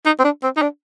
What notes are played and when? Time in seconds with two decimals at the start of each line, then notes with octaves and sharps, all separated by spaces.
0.06 D#4
0.19 C4
0.24 D4
0.43 C4
0.56 D#4
0.62 D4